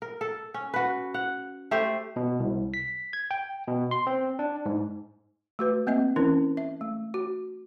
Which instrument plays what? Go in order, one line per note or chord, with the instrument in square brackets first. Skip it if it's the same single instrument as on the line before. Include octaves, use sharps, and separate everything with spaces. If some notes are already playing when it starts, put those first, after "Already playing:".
[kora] A#4
A4
C#4
F#4 B4
F#5
A3 G4 C5
[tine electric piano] B2
C2
B6
G#6
G5
B2
C6
C4
D4
G#2
[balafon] A3 F#4 B4
A#3 C4 D#5 E5
E3 C#4 D4 E4 A#4
E5
A3
F#4